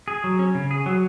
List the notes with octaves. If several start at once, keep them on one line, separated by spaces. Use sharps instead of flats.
G#4
F#3
C#4
C#3
G#4
F#3